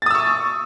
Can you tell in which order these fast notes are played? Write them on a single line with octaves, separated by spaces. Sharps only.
A6 D#6 E6 C#6